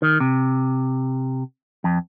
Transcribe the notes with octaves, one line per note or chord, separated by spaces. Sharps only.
D#3
C3
F2